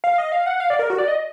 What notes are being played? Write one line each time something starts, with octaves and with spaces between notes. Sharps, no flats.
F5
D#5
F5
F#5
F5
D5
A#4
F#4
D5
D#5